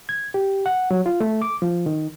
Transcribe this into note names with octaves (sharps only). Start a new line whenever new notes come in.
G#6
G4
F#5
F#3
F4
A3
D6
F3
D#3